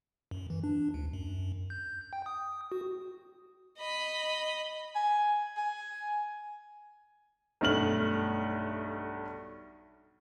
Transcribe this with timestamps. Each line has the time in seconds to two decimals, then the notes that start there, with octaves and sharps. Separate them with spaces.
0.31 F#2
0.50 E3
0.64 D4
0.94 D2
1.13 F#2
1.70 G6
2.13 G5
2.26 D#6
2.72 F#4
3.78 D#5 B5
4.95 G#5
5.57 G#5
7.61 B1 G2 A3 F6 F#7